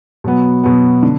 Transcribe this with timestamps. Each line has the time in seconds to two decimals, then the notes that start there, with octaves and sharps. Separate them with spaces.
0.24 B2 F#3 B3
0.64 B2 F#3 B3
1.03 D3